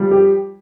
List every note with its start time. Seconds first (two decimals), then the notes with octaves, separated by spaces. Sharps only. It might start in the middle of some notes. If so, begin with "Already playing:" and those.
Already playing: F3 G3
0.11 G4